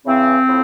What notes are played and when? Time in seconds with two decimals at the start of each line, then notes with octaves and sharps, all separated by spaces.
0.05 C#3 E3 C4
0.46 A2 F3